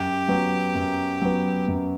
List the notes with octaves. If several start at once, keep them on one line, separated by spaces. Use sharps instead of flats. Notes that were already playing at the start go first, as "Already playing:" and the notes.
Already playing: F#2 G4
F#3 B3
F#2
F#3 B3
F#2